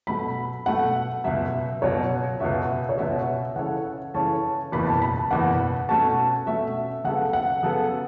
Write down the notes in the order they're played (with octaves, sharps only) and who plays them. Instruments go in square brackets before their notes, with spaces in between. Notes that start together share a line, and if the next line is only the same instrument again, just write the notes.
[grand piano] B2 F#3 A3 [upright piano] B5
[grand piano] B2 F#3 A3 [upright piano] F#5
[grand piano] C#2 B2 F#3 [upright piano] E5
[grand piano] C#2 B2 F#3 [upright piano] C#5
[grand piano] C#2 B2 B3 F#4 [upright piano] E5
[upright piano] C#5
[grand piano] C#2 B2 B3 F#4 [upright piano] E5
[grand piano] C#3 E3 C#4 A4 C#5 [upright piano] F#5
[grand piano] C#3 E3 C#4 A4 C#5 [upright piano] A5
[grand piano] F#1 E2 B2 [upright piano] B5
[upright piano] A5
B5
A5
[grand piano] F#1 E2 B2 [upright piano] F#5
[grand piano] B2 A3 C#4 F#4 [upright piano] A5
[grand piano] B2 A3 C#4 F#4 [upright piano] E5
[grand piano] C#3 F#3 B3 A4 [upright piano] F#5
[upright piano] F#5
[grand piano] C#3 F#3 B3 A4